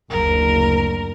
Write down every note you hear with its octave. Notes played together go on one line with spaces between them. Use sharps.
F#1 D2 A#4